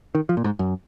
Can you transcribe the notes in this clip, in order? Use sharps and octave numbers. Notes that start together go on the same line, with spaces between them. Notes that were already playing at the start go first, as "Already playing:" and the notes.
D#3
F3
A#2
G#2
F#2